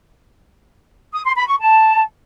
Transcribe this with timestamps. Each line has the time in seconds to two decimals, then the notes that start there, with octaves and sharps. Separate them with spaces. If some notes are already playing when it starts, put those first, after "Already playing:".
1.12 D#6
1.24 C6
1.36 B5
1.47 C#6
1.59 A5